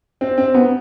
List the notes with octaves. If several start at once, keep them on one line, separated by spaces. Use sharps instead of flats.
C4
C4
B3